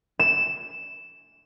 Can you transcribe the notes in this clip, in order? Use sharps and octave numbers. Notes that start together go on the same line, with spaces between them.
E7